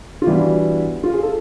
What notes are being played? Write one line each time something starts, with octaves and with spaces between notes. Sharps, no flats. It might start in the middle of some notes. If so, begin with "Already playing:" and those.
F4
E3 G3 B3 D4 E4 F#4
F4
G#4
A4